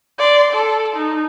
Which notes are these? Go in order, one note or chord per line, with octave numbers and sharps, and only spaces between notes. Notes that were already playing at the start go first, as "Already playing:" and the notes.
D5 C6
A4
D#4